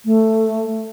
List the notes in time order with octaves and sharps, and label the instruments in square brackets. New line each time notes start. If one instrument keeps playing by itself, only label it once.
[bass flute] A3